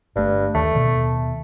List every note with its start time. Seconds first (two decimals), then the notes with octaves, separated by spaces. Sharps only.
0.16 G1 G2 A3
0.55 D#2 A3
0.75 D#2 B2